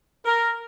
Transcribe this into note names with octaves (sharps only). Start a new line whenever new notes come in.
A#4